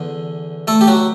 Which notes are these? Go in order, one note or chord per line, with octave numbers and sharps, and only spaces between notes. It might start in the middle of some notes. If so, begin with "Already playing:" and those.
Already playing: E2 D3
A3 A4
G4
F#3 F#4